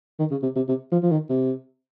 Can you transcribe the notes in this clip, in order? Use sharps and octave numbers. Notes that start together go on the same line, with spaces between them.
D#3
C#3
C3
C3
C3
F3
F3
D#3
C3